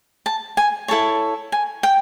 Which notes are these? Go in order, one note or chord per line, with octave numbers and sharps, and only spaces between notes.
A5
G#5
E4 A4 C#5 A5
G#5
G5